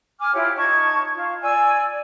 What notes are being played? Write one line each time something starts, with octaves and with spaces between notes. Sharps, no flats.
G#5 D6 F6
E4 F4 G4 C#5
D#4 A5 C#6 G#6
F4
D5 G#5 E6